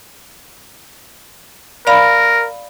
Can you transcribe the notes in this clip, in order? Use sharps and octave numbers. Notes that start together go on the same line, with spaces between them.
A#4 D5 F5 B5